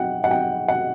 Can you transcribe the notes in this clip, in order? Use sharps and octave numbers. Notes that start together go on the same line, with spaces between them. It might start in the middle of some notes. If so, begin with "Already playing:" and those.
Already playing: F#5 G5
F#5
G5
F#5